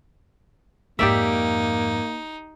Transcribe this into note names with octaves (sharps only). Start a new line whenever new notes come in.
F2 G#2 A#3 D#4 G4 D5 E5